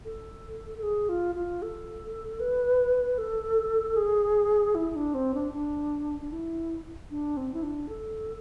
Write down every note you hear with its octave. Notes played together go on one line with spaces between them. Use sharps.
A4
A4
G#4
F4
F4
A4
B4
A4
G#4
E4
D4
C4
D4
D4
D4
E4
D4
C4
E4
D4
A4